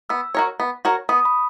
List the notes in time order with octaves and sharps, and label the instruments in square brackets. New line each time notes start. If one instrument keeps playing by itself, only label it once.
[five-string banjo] B3 [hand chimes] E6
[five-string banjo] F#4 A#4 C#5
B3
F#4 A#4 C#5
[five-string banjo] B3 [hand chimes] D#6
[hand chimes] B5